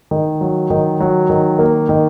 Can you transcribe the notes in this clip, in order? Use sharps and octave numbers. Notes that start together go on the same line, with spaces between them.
D#3
F#3
D#3
F#3
D#3
A#3
D#3